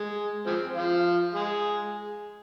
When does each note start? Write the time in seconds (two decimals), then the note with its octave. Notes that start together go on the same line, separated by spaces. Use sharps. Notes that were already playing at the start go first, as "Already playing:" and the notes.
Already playing: G#3
0.46 F3 G#3 C4
0.75 F3 F4
1.34 G#3 G#4